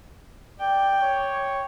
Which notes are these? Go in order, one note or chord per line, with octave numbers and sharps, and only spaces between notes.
D5 G5
C#5